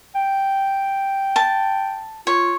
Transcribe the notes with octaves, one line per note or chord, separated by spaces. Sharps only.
G5
A5
F4 C#5